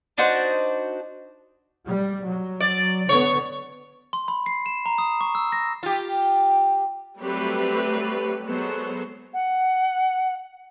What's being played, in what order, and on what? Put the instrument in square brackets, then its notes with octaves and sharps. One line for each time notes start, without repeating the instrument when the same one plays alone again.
[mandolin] D4 D#4 F#4 C5
[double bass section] G3
F#3
[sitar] D5
[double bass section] D3 B3 [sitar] C#5
[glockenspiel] C6
B5
C7
E7
A#5
D#6
C#6
E6
A#6
[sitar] F4 G4
[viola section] F#3 G3 A3 C4 G4 B4
F#3 G#3 B3 A4 C5
[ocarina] F#5